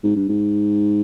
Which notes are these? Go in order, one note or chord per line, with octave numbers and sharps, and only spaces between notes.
G#2
G2
G#2